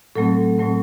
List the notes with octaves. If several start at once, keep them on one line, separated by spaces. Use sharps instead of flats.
A2 F#3 A3 C4 A4
A2 F#3 A3 C4